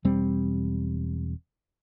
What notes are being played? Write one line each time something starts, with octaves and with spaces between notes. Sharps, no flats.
E1 G3 C4